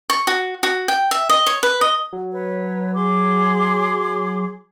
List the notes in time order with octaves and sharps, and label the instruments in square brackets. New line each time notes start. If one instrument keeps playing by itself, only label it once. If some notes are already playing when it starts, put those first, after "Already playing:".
[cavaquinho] C#6
F#4
F#4
G5
E5
D#5
C#5
B4
D#5
[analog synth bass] F#3
[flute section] B4 C#5
G#4 C6 D6